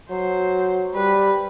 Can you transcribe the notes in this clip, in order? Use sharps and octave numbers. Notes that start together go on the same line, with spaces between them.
F#3 C5
G3 B4